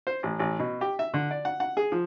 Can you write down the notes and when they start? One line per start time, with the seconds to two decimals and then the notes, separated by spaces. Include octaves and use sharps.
0.07 C5
0.23 A1
0.39 A1
0.59 B2
0.81 G4
0.99 E5
1.14 D3
1.31 D5
1.45 F#5
1.60 F#5
1.77 G#4
1.92 F3